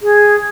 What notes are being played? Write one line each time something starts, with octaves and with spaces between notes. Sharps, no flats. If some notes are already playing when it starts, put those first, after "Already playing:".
G#4